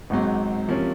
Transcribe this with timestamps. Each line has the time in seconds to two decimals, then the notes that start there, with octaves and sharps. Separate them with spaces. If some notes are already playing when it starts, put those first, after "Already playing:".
0.10 G#1 G#2 F#3 C4
0.68 C3 F3 A#3 C#4